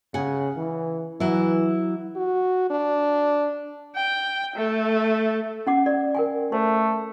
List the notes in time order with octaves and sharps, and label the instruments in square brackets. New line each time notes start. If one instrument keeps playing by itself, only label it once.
[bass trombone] C#3 [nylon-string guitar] F#5 G#5
[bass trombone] E3
[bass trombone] E3 [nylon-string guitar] F#3 E4
[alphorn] F#4
D4
[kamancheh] G5
A3
[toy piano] C#4 F#5 D6
D5
A#4 G5 G#5
[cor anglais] A3 [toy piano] C5